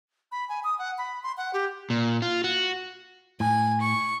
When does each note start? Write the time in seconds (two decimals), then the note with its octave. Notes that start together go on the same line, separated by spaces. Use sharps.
0.32 B5
0.49 G#5
0.64 D#6
0.79 F#5
0.98 B5
1.23 C6
1.37 F#5
1.54 G4
1.90 A#2
2.22 F4
2.44 F#4
3.40 A2 G#5
3.81 C#6